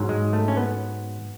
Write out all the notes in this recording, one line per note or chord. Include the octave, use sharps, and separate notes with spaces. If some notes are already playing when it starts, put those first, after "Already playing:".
Already playing: G#2 F#3
G#3
A3
C#4
B3